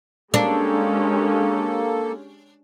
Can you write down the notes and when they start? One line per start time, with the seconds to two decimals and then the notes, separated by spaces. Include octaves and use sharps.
0.34 G#3 A#3 C#4 D4 G4 A4